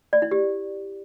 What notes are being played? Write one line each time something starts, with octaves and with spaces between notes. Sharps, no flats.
D5
E4
G4